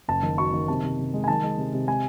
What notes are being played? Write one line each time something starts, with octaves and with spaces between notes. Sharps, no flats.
F#1 A5
D#3
F#3 C#6
D#3
C3 A5
C3
C3
G#3
G#5
D#3 A5
G#3
C3
C3
G#3 G#5